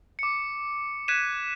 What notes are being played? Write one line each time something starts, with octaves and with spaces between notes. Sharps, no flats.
D6 C#7
F#6 G#6 B6 D#7 E7